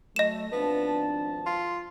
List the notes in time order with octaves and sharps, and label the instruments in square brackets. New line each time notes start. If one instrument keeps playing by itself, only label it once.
[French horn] F#3 [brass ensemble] A3 [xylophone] D#5 E7
[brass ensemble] G#1 F3 A5 [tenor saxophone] B3 [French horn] D4
[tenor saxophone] F4